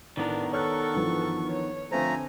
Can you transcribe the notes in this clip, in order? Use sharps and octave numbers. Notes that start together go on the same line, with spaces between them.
A2 D#3 B3 D4 A#4
A4 C#5 C#6 F6 F#6
G2 E3 F3
C#5
D3 F3 A3 C4 C5 G#5 A#5